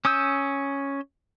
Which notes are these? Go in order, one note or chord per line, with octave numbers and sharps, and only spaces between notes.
C#4 D#6 E6 G6